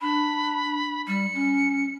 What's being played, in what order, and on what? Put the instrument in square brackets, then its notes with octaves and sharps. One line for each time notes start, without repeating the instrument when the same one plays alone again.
[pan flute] D4 [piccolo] B5
[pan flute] G3 [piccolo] C#7
[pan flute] C#4